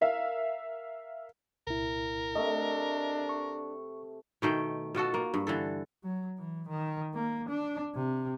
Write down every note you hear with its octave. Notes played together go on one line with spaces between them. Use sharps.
A#4 E5 F5
C2 A#2 E4 A#4
C3 A3 D4 D#5
C#6
B2 D#3 A3 G5
B2 F4 F#4 A4
A#3
G2
D3 E3 A4
F#3
E3
D#3
A#3
D4
C3